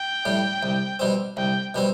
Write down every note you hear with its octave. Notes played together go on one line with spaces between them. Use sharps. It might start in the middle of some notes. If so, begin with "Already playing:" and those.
Already playing: G5
A2 G3
C2
B2 G3 C4
C2 G5
B2 G3 C4